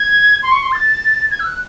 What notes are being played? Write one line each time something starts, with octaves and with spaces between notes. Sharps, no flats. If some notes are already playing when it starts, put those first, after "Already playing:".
Already playing: G#6
C6
C#6
C6
A6
G#6
E6
F#6